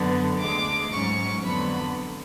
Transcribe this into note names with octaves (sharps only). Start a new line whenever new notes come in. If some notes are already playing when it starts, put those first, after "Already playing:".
Already playing: F#2 D3 F#3 B3
D2 D3 G#3 D6
G#2 F#3 C#4 C#6
F2 D3 F#3 B3 B5